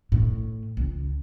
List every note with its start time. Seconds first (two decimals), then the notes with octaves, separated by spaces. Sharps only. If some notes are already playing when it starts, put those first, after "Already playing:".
0.12 A2
0.77 C#2